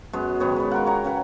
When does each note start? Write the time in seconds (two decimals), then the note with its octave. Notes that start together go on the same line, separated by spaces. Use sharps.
0.13 F#2 G#3 B3
0.40 G#2 D#3 B3 C#5
0.56 C#5 B5
0.71 F4 A#4 F#5
0.86 C#5 F#5 G5 A#5
1.05 C#3 B4 F#5